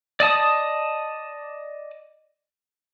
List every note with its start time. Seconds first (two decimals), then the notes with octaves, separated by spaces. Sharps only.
0.20 D5 D#5 A5 D#6